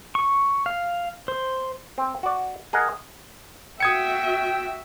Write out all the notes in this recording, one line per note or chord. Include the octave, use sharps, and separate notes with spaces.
C#6
F5
C5
C4
F#4 D5
G#4 A#4 D#5 F#5
F#4 E5 G5 D#6 G#6 C#7